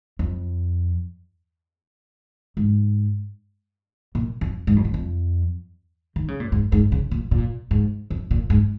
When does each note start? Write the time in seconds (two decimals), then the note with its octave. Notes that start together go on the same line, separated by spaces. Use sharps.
0.19 F2
2.57 G#2
4.15 A#2
4.41 F2
4.67 G#2
4.76 F2
4.85 G#2
4.94 F2
6.16 D#3
6.28 C#3
6.40 A#2
6.52 G#2
6.72 G#2
6.92 C#3
7.11 A#2
7.31 A#2
7.71 G#2
8.10 F2
8.31 A#2
8.50 G#2